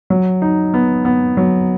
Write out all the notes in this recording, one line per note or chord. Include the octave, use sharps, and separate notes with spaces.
F#3
D#4
B3
B3
F#3